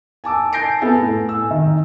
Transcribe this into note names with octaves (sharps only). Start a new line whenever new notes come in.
G#5 A5 D6 E6
G#5 A5 G6 A#6 C7 D7
B3 A4 G#5 A5
A2
G#5 E6
D#3